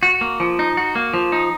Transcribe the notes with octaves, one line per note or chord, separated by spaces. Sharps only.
F#4
A#3
F3
D#4
F#4
A#3
F3
D#4